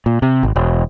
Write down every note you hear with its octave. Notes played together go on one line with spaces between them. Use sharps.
A#2
C3
G#1
E1